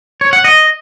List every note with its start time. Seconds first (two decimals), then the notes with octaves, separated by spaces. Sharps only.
0.21 C#5
0.33 F#5
0.44 D#5